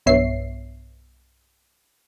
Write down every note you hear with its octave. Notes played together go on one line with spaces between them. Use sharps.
B1 G2 B3 C#5 E5 C7